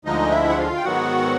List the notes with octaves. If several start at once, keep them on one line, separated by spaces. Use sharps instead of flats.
D2 D3 F3 G#3 D#4 D#5
E4 E5
F#5
F4 F5
G5
G#2 D#3 F#3 B3 F#4 F#5